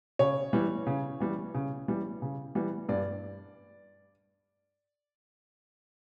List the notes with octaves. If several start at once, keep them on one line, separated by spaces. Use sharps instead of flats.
C#3 C#5
E3 G3
C#3
E3 G3
C#3
E3 G3
C#3
E3 G3
G2 D5